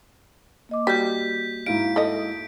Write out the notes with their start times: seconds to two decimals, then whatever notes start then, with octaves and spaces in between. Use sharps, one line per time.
0.69 A#3 D#5 D6
0.87 G3 F#4 G6 B6
1.66 G#2 E4 F5 D7
1.96 A3 D#5